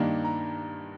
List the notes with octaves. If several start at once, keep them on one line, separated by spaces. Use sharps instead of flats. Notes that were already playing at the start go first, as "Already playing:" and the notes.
Already playing: G2 D#3 A#3 D4
A#5